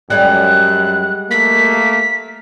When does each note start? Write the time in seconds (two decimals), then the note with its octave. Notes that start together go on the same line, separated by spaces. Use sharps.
0.10 F#2 G3 G#3 F#6
1.31 A3 A#3 B6